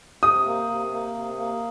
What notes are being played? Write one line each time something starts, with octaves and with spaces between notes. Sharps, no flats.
C3 D#6
A#3
C3
A#3
C3
A#3